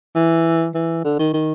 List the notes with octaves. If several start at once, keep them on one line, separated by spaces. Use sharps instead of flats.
E3
E3
D3
D#3
D#3